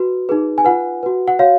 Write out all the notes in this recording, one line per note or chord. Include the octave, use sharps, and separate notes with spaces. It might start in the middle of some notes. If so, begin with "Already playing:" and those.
Already playing: F#4 B4
D#4 G#4 B4
G#5
F4 B4 F#5
F#4 B4
F#5
F#4 C#5 F5